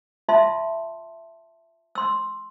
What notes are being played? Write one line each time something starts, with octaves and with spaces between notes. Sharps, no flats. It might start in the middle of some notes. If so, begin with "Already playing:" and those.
F4 E5 A5 C6
C6 E6